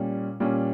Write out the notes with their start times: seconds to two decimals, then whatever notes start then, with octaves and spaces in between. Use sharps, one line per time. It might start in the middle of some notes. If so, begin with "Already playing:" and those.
Already playing: A#2 G3 C#4
0.40 A#2 G3 C#4